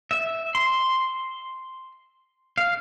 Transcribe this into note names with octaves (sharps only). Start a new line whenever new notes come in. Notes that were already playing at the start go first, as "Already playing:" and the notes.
E5
C6
F5